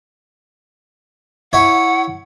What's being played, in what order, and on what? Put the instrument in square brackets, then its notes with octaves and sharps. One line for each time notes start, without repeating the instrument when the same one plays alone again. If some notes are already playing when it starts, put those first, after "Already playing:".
[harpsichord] E4 C#5 [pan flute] F#5